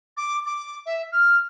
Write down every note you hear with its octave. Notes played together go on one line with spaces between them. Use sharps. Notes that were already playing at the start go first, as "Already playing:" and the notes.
D6
D6
E5
F6